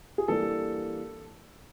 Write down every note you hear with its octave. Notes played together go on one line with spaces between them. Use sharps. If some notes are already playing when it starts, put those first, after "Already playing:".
G#4
E3 G3 A#3 D4 A4